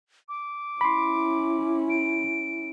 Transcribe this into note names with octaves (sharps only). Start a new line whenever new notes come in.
D6
C#4 E4 B5 C6
D7